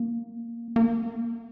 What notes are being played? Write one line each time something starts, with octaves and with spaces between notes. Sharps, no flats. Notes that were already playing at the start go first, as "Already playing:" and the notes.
Already playing: A#3
A#3